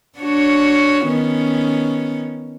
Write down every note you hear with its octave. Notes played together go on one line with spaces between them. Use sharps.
D4 F#4 C#5
D#3 B3 C#4